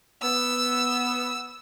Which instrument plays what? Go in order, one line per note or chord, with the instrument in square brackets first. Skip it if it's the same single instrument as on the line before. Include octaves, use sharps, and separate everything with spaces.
[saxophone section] B3 [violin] E6